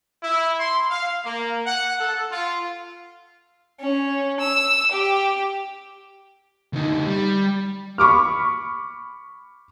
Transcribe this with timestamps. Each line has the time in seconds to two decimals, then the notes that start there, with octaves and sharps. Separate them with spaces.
0.23 E4
0.58 C6
0.90 F5
1.24 A#3
1.66 F#5
1.99 A4
2.30 F4
3.80 C#4
4.40 E6
4.91 G4
6.73 D2 D#4
7.06 G3
7.98 B5 C#6 D6 F6